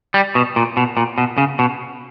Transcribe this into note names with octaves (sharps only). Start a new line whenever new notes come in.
G3
B2
A#2
B2
A#2
B2
C#3
B2